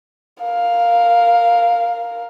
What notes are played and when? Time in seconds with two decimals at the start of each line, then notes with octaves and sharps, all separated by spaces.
0.43 A#4 F5